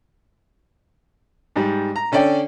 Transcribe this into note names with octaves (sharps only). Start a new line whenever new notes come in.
G#2 G3
A#5
D3 C#4 A4 D5 G5